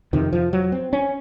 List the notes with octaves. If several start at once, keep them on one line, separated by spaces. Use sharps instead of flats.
F2 C3 D#3
F3
F#3
C4
C#4